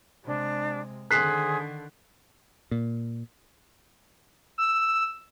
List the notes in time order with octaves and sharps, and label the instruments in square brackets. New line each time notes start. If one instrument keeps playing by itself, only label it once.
[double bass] C3 G#3 [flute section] D4
[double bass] D3 D#3 [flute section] G#4 C5 [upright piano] F#6 B6 C7
[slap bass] A#2
[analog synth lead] E6